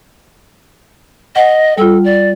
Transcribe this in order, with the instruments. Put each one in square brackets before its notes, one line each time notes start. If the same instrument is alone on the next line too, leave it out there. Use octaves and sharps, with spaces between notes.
[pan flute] D#5 [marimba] F#5
[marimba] G3 F4 [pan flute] A4
[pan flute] D5